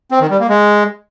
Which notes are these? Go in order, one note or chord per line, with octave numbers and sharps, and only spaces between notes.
C4
D#3
G3
A#3
G#3